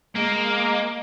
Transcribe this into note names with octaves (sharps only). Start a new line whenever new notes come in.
G#3 A#3